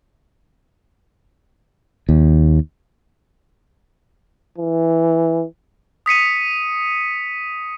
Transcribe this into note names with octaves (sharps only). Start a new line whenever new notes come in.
D#2
E3
D#6 B6 C#7 D#7